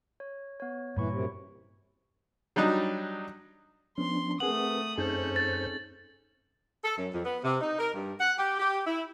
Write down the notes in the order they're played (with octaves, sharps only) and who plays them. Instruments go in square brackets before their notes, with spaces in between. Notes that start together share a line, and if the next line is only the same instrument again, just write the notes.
[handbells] C#5
B3 C#5
[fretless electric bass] G2 A#2 [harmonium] E3 [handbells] C#5 B5 C#6
[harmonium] F#2 C3
[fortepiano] F#3 G3 D4 D#4
[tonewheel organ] F3 D4 [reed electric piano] B3 C#4 [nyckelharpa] C6
[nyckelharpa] A3 D#6 [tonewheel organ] C4 A#4 B4 [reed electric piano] G#4 F#5 [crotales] F#7
[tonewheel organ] F#2 C5 G6 [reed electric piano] C4 D#4 G#4 [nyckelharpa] C#4 A4
[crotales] A6
[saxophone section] A4
F#2
F2
B3
C3
D#4
A#4
G2
F#5
G4
G4
E4